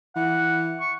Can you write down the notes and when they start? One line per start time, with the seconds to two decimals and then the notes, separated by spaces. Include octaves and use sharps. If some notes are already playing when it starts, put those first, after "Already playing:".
0.16 E3 F#5
0.80 C#6